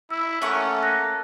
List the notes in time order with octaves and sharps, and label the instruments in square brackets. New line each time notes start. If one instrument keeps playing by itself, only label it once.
[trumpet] E4 [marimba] E6
[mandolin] A3 F#5 C#6 [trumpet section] A#3 A4 [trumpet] C#4
[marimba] F#6 A#6